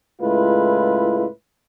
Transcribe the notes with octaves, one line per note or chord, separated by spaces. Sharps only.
C#2 A2 G#3 E4 F4 B4